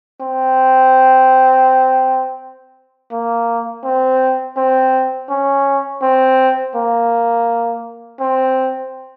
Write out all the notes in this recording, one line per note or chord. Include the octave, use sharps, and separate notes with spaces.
C4
A#3
C4
C4
C#4
C4
A#3
C4